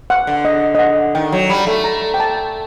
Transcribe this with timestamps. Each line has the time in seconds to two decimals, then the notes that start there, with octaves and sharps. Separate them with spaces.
0.10 F#5
0.27 D3
0.45 D#5
0.75 D#5
0.79 F#5
1.15 D#3 G5
1.32 F#3
1.50 G3
1.67 A3
1.84 A#5
2.14 G5
2.20 A5